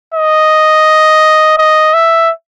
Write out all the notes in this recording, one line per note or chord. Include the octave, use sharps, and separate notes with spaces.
D#5
D#5
E5